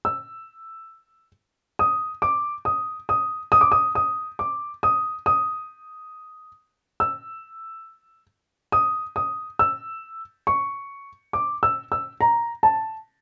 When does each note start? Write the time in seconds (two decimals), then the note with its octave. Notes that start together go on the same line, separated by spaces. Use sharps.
0.05 E6
1.79 D#6
2.22 D6
2.65 D#6
3.09 D#6
3.52 D#6
3.61 D6
3.72 D#6
3.95 D#6
4.39 D6
4.83 D#6
5.26 D#6
7.00 E6
8.72 D#6
9.16 D#6
9.59 E6
10.47 C#6
11.33 D6
11.63 E6
11.92 E6
12.21 A#5
12.63 A5